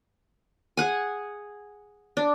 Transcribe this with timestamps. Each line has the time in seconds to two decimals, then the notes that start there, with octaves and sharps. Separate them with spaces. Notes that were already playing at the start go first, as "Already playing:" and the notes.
0.77 G#4 F#5 G#5
2.17 D4